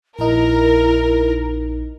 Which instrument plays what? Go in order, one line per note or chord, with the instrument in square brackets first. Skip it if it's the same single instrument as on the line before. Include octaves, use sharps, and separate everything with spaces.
[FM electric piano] A#1 D#4 [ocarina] E4 [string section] A#4